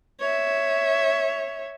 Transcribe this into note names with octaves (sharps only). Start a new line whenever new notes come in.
C#5 E5